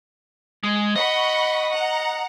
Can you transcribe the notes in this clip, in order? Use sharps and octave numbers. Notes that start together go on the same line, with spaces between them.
G#3
D#5 F#5 B5 C#6
F#5 A#5